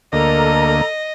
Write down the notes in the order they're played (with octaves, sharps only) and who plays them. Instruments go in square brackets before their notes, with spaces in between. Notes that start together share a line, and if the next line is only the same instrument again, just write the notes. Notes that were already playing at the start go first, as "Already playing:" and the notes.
[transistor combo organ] D2 A#3 [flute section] A4 A#5 [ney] A#4 [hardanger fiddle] D#5